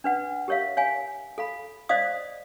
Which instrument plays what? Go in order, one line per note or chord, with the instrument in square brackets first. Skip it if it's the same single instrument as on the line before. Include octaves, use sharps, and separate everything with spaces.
[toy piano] D4 B4 F#5
G4 A#4 C#5 E5 F5
C#5 F5 G#5
A4 F5 B5
C5 D5 D#5 F5 D#6